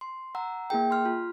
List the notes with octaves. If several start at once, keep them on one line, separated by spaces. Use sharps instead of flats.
C6
F#5 A#5 E6
A#3 E4 G#4 G5
C6 F6
F4